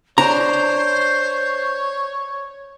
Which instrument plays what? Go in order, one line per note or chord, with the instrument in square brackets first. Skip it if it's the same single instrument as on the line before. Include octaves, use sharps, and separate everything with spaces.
[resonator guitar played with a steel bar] D4 [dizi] C5 [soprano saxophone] C#5 [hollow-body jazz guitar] A#5